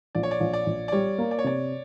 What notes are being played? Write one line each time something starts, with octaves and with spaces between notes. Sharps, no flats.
A#1 D5
C#5
D5
A#1
D5
A#1
D5
G3 C#5
A#3
D5
C#5
C3 D5